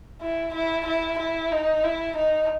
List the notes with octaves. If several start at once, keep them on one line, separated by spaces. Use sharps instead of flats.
E4
E4
E4
E4
D#4
E4
D#4